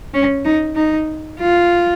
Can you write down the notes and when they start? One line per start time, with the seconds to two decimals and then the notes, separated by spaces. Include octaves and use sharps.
0.14 C#4
0.45 D#4
0.76 D#4
1.39 F4